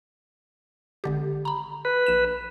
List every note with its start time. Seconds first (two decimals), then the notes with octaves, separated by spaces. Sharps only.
1.04 G#1 D3 G4
1.45 A#5 B5
1.85 B4
2.06 A#1 E7